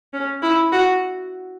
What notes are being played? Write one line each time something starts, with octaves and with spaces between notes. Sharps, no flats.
C#4
E4
F#4